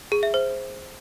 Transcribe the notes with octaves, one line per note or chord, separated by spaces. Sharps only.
G#4
E5
C5